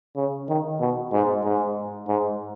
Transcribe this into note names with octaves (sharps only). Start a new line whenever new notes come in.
C#3
D#3
B2
G#2
G#2
G#2